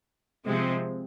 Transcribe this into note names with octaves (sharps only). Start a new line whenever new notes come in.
C3 F3 G#3 C4